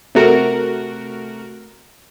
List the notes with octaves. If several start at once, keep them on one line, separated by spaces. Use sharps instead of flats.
C3 A3 F#4 A#4